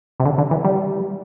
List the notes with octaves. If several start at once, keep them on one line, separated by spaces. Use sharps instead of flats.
C3
D3
D3
E3
G3